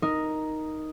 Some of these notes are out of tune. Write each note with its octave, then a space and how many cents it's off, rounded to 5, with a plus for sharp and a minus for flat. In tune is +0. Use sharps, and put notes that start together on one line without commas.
D#4 +0 A#4 +5